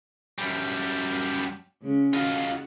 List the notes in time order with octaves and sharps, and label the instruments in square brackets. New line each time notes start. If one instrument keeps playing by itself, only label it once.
[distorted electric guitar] F#2 G3
[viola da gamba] C#3 G#3 C#4
[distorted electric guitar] F4 D#5 [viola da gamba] F#4